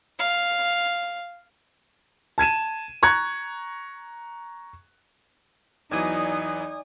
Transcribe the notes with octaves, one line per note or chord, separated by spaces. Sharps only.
F5
A5 G#6 D#7 E7
A#5 C#6 F#6 G#6
E2 E3 F#3 D#4 D5 G#5 D#6